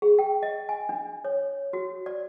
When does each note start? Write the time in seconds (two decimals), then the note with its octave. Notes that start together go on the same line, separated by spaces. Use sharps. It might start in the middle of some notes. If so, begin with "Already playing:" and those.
0.02 G#4
0.19 G5
0.43 D#5
0.69 G#5
0.89 D4
1.25 C#5
1.73 F#4
2.06 D5